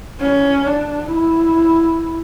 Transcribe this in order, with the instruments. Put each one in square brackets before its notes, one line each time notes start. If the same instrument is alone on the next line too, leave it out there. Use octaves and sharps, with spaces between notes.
[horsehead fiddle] C#4
D4
E4